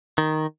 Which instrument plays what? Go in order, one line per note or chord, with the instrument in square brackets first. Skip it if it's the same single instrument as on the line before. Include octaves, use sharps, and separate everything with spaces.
[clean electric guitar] D#3